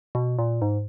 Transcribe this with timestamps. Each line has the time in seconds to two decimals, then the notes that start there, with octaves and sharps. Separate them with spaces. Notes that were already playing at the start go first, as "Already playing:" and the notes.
0.15 B2
0.39 A#2
0.62 G#2